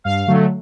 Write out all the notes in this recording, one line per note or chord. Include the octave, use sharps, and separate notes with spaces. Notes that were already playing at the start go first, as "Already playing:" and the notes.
G2 F5
D3 F#3 A3